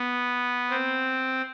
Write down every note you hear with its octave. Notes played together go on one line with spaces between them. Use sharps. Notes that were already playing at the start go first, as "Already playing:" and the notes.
Already playing: B3
C4